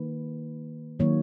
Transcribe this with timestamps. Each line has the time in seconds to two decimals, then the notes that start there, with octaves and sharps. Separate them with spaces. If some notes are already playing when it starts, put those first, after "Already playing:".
Already playing: D#3 A#3 B4
0.99 D#3 F#3 A#3 C#5